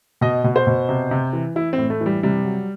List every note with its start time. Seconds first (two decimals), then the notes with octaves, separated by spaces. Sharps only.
0.21 B2 D#5
0.44 B2
0.56 C5
0.67 B2
0.89 C3
1.11 C3
1.33 E3
1.56 E3 E4
1.73 C4
1.78 A2
1.90 A3
2.01 E3
2.06 G3
2.23 C3 G3
2.45 F#3